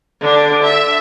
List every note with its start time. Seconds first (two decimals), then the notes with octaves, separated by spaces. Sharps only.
0.21 D3 D4
0.63 E5